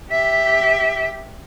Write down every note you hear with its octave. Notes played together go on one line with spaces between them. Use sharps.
G4 E5